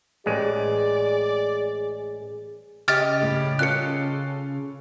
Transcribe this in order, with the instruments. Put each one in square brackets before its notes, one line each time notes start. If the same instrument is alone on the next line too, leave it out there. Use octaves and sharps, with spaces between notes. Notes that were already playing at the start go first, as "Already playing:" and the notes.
[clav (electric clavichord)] A1 G#3 [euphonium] G#4 [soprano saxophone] D5
[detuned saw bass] C#3 [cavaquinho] G4 D#5 [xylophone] F6 A6
[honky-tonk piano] A2 G3
[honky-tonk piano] C#4 F4 A4 [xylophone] F#6 C#7